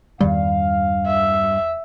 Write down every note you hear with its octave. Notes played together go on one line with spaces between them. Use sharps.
E2 G2 D#3 G3 F5
E5